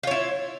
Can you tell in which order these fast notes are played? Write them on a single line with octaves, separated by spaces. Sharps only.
F4 C#5 E4